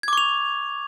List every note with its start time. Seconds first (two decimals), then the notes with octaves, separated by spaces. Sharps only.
0.03 G#6
0.08 D6
0.13 C#6
0.17 F7